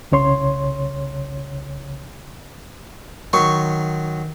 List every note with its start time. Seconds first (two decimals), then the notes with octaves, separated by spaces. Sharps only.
0.12 C2 C#3 C#5 C6
3.33 D#3 F#3 C6 C#6